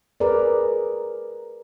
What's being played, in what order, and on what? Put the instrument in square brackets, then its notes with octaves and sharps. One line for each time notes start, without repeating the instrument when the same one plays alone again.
[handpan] G#4 A#4 B4 D5